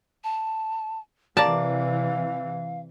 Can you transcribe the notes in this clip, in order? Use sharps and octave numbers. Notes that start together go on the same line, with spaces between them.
A5
C3 E3 G4 A#4 D5 F5 A5